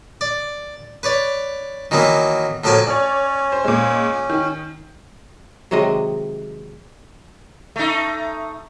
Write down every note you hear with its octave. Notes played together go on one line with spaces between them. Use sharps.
D5
B4 C#5 D5
D#3 E3 F#3 A#3 B3
A2 F3 F#3 A#3 G5 G#5
C#4 C#5 D5
C5
A#2 G#3
D#3
C3 D#3 F#3 G#3 D#5
A3 D#4